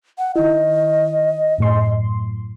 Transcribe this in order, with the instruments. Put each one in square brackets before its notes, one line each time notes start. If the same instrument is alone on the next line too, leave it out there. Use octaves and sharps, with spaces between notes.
[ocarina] F#5
[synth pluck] D#3 E4 [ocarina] D#5
[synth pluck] F#2 A2 C6